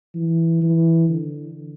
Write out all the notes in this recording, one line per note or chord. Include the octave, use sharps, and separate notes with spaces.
E3
E3
D3